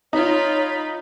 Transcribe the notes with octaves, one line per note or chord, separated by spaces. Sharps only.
D#4 F4 C#5 B5